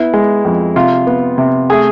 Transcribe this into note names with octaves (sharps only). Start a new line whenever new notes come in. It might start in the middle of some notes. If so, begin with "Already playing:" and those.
Already playing: B3 E4
G#3
F2
C3 F4
B3
C3
A3 G#4